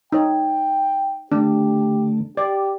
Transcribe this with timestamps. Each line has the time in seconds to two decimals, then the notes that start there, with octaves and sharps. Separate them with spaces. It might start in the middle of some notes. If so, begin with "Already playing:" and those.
0.12 D#4 C#5 G5
1.32 D3 A3 D4 G4
2.37 G4 D5